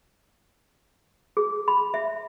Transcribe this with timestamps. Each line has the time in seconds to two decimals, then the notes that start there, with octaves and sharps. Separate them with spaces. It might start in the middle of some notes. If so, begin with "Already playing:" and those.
1.37 G#4
1.68 B5
1.94 E5